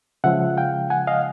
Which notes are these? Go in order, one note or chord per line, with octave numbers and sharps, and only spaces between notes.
C#3 F3 G#3 E5 F#5
F5 G5
F#5 G#5
D#5 F5